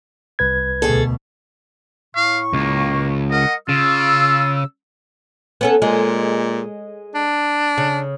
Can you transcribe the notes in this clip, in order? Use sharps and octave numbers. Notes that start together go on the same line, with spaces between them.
C2 B4 G#6
D2 B2 G#4 A4
A2 F5 C#6
C#2 A#3
A#4 D#5 F#5
C#3 F4 E6
B3 C#4 A4
A#2 G#3
D4
C#3